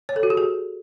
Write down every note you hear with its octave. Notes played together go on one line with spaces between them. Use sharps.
C#5
A4
F#4
G4
G#4